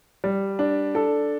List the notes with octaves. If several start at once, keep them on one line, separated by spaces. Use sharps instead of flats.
G3
D4
A4